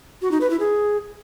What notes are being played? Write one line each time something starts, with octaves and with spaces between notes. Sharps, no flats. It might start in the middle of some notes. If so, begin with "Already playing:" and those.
F#4
D#4
B4
E4
G#4